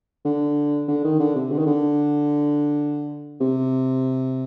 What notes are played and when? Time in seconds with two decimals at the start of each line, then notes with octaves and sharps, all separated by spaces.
0.25 D3
0.88 D3
1.04 D#3
1.19 D3
1.35 C3
1.51 D3
1.58 D#3
1.66 D3
3.41 C3